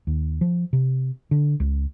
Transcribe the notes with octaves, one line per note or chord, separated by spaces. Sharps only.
D#2
F3
C3
D3
C#2